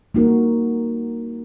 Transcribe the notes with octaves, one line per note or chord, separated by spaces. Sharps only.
G3 A#3 D#4 F#4 A#4